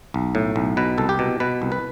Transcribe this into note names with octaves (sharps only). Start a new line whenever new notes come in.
B1
A2
B1
B2 B4
C2 A4
G4
B2
B2 B4
C2
B4